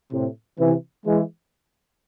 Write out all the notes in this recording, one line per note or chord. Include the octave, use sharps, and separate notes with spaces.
A2 C3
C3 E3
E3 G#3